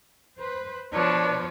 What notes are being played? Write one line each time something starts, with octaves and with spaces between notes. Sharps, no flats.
B4 C5
B2 F3 D4 B4 C#5